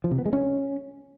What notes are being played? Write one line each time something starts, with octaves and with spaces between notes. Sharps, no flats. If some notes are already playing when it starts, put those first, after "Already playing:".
F3
C3
B3
G#3
C#4